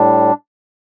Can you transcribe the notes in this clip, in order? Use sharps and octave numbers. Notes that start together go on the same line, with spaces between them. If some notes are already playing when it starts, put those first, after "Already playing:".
Already playing: A2 G3 D4